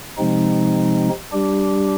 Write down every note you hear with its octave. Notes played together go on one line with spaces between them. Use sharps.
C3 F3 G#3 C4 D#4
G3 D4 G4